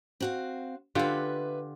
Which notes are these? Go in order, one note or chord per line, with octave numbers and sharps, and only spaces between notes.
C4 F#4 F5
D3 F4 G4 B4 E5